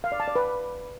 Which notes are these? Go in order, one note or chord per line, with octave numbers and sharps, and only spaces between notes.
F5
D5
A5
D5
B4